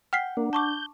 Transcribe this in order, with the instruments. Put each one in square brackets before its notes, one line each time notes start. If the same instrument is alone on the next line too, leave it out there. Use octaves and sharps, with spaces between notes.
[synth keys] F#5 [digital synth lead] G5 [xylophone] F6 B6 C7
[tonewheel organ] A#3 [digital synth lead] D4
[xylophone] A5 C#6 D6 [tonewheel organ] G6